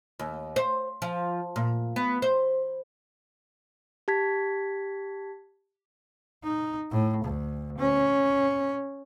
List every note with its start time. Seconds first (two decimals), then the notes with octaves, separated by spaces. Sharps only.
0.19 D#2
0.56 C5
1.02 F3
1.56 A#2
1.96 B3
2.22 C5
4.08 G4 A5 G#6 B6
6.43 D#4
6.91 A2
7.25 D2
7.78 C#4